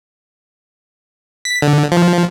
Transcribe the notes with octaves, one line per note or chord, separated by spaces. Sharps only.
B6
D3
F3